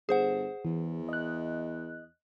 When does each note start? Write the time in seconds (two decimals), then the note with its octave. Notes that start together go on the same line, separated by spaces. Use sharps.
0.09 G1 G#4 C5 F#5
0.65 E2 E3
1.09 D#5 F#6